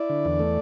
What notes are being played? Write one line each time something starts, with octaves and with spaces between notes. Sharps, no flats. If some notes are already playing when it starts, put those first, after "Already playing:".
Already playing: E4 D5
D3
E2
A3